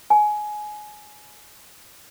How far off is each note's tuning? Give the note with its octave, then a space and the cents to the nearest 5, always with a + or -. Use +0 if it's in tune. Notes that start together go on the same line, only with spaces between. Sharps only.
G#5 +20